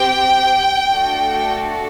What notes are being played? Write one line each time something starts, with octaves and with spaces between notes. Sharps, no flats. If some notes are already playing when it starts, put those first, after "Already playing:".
Already playing: C4 G4 G5
A3 D4 F#4 A4